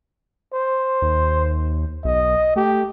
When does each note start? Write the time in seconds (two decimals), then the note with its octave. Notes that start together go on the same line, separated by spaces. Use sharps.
0.53 C5
1.02 D#2
2.04 B1 D#5
2.56 A3 G4